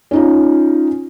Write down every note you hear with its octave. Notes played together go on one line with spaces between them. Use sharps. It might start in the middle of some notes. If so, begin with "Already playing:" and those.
C#4 D#4 F4